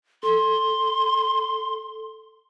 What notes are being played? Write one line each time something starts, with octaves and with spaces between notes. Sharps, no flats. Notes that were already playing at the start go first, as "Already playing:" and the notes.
A4 C6